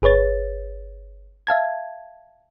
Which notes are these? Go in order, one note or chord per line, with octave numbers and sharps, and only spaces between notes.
G1 G#4 B4 C#5 A6
E5 F5 A5 G#6